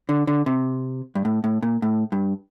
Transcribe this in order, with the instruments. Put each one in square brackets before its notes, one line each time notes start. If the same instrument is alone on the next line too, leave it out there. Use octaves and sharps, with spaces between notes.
[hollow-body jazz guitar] D3
D3
C3
G2
A2
A2
A#2
A2
G2